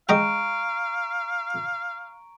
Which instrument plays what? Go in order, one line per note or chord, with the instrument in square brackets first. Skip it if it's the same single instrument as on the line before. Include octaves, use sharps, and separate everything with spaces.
[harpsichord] G#3 D#5 G5 [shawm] F5 [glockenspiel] A#5 C#6 D7